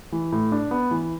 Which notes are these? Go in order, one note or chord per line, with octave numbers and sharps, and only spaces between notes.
E3
A2
D4
B3
E3